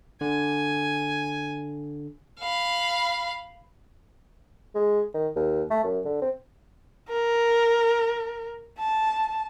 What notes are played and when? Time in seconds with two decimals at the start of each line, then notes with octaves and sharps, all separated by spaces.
0.21 D3 G#5
2.40 F5 B5
4.75 G#3
5.14 D#3
5.36 D#2
5.70 A3
5.84 F#2
6.05 D3
6.22 C4
7.09 A#4
8.79 A5